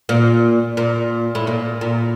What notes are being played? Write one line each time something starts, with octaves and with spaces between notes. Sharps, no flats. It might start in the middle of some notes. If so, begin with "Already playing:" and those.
A#2
A#2
A2
A#2
A#2